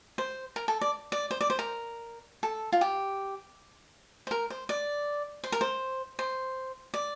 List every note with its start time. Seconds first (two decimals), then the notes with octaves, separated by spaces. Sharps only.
0.18 C5
0.56 A#4
0.68 A4
0.81 D5
1.12 D5
1.31 C5
1.41 D5
1.50 C5
1.59 A#4
2.43 A4
2.72 F4
2.81 G4
4.27 C5
4.31 A#4
4.50 C5
4.69 D5
5.44 C5
5.52 A#4
5.61 C5
6.19 C5
6.94 D5